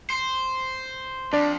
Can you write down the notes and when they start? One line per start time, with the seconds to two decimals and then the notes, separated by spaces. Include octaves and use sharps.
0.10 C5
1.33 F2 D4 D5